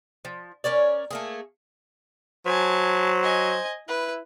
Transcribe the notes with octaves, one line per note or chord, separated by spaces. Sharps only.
F3
C#4 A#4 C#5 D5
A3 A#3 G#4
F#3 C5 G#5 A5
D#5 G#5
E4 B4